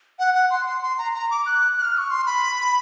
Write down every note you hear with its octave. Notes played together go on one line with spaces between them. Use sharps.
F#5
F#5
C6
C6
C6
A#5
A#5
D6
F#6
F#6
F6
C#6
C6
B5